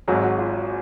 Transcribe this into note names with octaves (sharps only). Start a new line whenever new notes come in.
G#1 G#2 F#3 G#4
F#4
F4